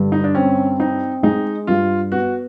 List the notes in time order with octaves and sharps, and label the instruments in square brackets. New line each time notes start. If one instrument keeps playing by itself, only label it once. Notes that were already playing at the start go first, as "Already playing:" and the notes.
Already playing: [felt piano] G2 D3
[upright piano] D#4
D4
[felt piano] C4 [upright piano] C#4
[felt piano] C4 [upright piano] D#4
[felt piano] G#3 [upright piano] D#4
[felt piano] G2 [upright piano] F4
[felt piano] B3 [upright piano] F#4